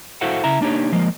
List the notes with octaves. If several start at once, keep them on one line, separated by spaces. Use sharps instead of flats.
E4 F#4 A4 C5 F5 F#5
C#3 E4 E5 A#5
A#3 D4 D#4 G4 C#5
F3 G#3 A#3